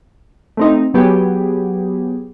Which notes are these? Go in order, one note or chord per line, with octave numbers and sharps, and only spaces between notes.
A3 C4 D#4
F#3 B3 G4 G#4